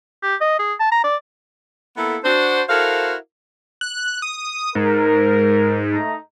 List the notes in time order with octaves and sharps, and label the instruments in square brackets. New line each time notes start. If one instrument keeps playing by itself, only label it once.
[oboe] G4
D#5
G#4
A5
A#5
D5
[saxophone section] A#3 B3 E4 A4
D4 F#4 C5
E4 F#4 A4 A#4 C5 F5
[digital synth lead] F#6
D#6
[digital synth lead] G#2 [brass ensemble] A#4
[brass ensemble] A3 D#4 A#5